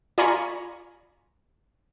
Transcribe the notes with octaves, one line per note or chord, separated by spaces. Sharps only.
F4 D5 G#5 A#5 B5 C#6